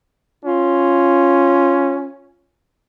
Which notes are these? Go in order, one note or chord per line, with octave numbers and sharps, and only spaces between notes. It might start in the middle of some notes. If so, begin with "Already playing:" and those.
C#4 F4